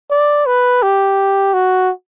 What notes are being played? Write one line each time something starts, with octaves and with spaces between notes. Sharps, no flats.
D5
B4
G4
F#4